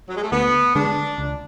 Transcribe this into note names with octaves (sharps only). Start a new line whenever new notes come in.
F#3
G#3
A3
D2 B3
D3 G#3 D4
C#2